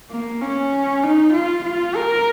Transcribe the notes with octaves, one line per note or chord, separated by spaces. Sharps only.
A#3
C#4
D#4
F4
F4
A#4